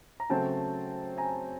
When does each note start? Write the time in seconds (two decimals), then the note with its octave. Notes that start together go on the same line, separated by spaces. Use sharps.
0.20 A#5
0.30 C#3 F#3 A3 C4 G5 A5
1.18 G#5 A#5